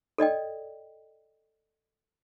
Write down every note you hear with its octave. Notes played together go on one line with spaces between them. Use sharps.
A4 D5 D#5 G5